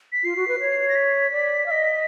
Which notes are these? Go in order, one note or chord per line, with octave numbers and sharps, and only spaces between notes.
B6
F4 C7
F#4
B4
C#5
A#6
B6
D5
F5
D#5